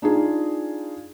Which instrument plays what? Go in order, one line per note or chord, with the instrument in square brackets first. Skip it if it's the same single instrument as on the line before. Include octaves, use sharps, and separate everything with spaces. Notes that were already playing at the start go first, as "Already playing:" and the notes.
[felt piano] D4 D#4 F4 G#4